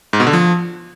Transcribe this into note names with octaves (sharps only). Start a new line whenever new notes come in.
G#2
B2
D3
F3